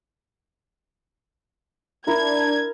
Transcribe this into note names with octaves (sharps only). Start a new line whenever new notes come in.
D4 E4 A#4 G#6